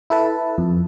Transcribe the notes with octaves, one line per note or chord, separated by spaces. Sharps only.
E4 A4 B4 A5
F2